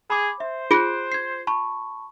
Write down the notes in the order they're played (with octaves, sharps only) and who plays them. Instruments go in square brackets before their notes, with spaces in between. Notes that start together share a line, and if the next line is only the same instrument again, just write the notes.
[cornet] G#4 [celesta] B5 D6
[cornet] C5 [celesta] E5
[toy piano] F4 G#4 [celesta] F#6 D7
[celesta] G#6 C7
A5 B5 C#6